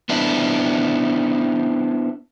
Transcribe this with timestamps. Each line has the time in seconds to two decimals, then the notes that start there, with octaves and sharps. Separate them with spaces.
0.09 B3 C4 D4 E4